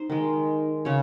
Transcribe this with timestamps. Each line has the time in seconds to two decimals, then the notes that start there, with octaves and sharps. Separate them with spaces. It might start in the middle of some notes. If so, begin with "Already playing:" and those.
Already playing: D#4 C5
0.10 D#3 G#3
0.85 C#3 C#5